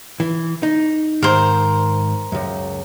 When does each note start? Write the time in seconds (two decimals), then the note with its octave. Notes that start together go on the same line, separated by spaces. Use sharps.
0.20 E3
0.63 D#4
1.23 G#2 D#3 A#4 C5
2.32 C#2 F#2